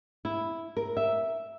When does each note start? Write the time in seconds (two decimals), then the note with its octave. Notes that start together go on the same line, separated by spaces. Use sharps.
0.25 E4
0.77 A#4
0.97 E5